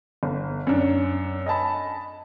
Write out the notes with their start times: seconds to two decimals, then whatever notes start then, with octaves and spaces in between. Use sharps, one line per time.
0.23 G1
0.67 F#2 D4
1.46 D#5 G#5 A5 B5